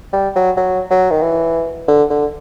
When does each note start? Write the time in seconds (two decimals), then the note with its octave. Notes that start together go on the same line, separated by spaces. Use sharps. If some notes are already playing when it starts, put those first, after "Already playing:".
0.13 G3
0.36 F#3
0.57 F#3
0.90 F#3
1.11 D#3
1.22 E3
1.88 D3
2.10 D3